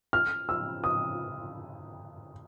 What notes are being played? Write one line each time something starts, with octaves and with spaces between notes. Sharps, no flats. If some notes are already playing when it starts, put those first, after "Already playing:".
F6
E6
D#6